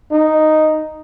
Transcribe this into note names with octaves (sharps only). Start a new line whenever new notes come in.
D#4